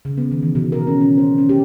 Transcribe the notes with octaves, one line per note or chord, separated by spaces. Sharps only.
C#3
B3
D#3
E3
B2
A#4
C#4
C#4
C5
C#4
G4